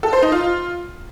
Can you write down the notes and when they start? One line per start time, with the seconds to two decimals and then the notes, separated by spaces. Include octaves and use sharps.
0.03 A4
0.13 C5
0.22 D#4
0.32 F4